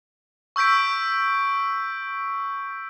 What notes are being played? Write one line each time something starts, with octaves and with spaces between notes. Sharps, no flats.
C#6 E6 G6 B6 D7